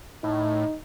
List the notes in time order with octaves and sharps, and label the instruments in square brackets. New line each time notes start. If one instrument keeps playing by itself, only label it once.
[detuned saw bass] A2 [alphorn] D#4